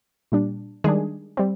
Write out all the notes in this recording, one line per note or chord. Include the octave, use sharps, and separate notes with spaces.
A#2 G3 D4
D#3 G3 G#3 D4 G#4
G3 C4